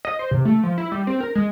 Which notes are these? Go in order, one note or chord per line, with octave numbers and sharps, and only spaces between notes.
D#5
C5
C3
A3
F3
E4
G3
C4
A#4
G#3